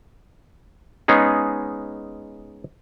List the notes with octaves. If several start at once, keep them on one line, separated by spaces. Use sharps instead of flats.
G#3 B3 C#4 D#4 G#4